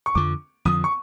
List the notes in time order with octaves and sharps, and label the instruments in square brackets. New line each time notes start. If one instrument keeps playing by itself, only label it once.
[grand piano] C#6
[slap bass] F2 D3 F3 [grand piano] D6
[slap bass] F2 D3 F3 [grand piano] D#6
[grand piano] C#6